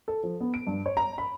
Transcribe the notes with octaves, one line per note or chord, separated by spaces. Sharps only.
A4
F3
B3
D7
G2
C#5
A#5
B5